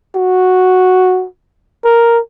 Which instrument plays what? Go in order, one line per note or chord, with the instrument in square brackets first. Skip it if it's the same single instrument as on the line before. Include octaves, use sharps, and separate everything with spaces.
[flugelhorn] F#4
A#4